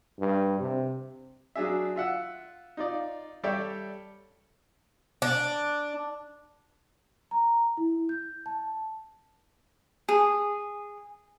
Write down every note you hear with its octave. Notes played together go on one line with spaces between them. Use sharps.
G2
C3
F#3 D4 G#4 E5
F4 E5 F#5 E6
D#4 F4 D5
G3 A4 C#5 D5 E5 G5
D4
A#5
E4
G6
A5
G#4